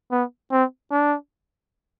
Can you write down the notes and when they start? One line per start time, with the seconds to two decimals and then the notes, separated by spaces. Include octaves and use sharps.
0.11 B3
0.51 C4
0.91 D4